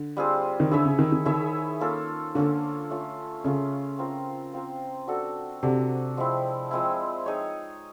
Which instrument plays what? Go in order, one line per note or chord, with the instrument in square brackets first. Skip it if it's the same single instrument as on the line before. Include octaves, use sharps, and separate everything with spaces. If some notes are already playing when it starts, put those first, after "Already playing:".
Already playing: [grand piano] D3
[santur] G3 C4 F4 G#4
[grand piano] D#3
[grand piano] D3 [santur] E4 G#4 C#5 E5
[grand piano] C#3
D#3
D#3
[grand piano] D#3 [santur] E4 G#4 C#5 E5
[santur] A#3 C#4 F4 A4
[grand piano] D3 [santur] A#3 C#4 F4 A4
[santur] A3 C#4 F4
[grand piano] C#3 [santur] A3 C#4 F4
[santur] C4 F4 A#4
C4 F4 A#4
D4 F#4 A4
[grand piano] C3 [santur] D4 F#4 A4
[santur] F3 G#3 C4 E4
F3 G#3 C4 E4
D#4 G#4 C#5